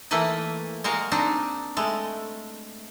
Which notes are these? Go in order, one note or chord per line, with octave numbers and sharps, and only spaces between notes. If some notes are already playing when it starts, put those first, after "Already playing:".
E3 A3 A#3 B4 D#5
G#3 F#4 A#4 F5
C4 D4 D#4
G#3 A3